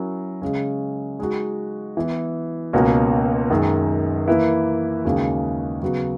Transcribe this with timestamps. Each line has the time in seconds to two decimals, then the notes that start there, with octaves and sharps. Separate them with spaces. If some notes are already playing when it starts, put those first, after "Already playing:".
Already playing: F#3 C#4 E4 A#4
0.42 C#3 G#3 C#4
1.19 G#3 D#4 F#4
1.97 E3 B3 E4
2.73 C#2 B2 A#3 C#4 F#4
3.50 F#2 D#3 G#3
4.27 E3 A#3 E4 B4
5.04 D#2 C#3 G#3 C#4 F#4
5.82 C#3 F#3 B3 F#4